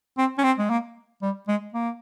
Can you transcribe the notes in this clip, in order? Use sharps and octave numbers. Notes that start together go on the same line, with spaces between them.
C4
C#4
C4
G#3
A#3
G3
G#3
A#3